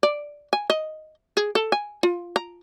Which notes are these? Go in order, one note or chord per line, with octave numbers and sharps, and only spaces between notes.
D5
G#5
D#5
G#4
A4
G#5
F4
A#5